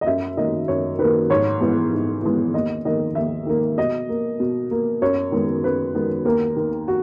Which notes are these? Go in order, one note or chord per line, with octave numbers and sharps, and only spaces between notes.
D#5
F#2 E5
D#3 A#3 D#5
F#2 C#5
D#3 A#3 B4
G#2 C#5
E3 G#3 B3
G#2
E3 G#3 B3
D#2 D#5
D#3 A#3 D#5
D#2 E5
D#3 A#3
B2 D#5
A#3
B2
A#3
F#2 C#5
D#3 G#3 B3
F#2 B4
D#3 G#3 B3
D#2 A#4
D#3 A#3
F#4